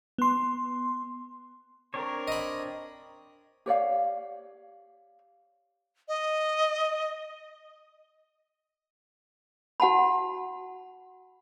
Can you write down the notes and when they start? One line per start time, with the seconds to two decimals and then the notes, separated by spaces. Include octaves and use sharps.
0.18 B3 C6
1.94 C4 D4 A#4 C#5
2.28 D#5 B5
3.66 G4 C#5 D5 F5
6.08 D#5
9.80 F#4 F#5 A5 B5